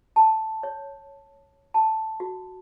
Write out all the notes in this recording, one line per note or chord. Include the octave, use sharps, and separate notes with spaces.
A5
C#5
A5
F#4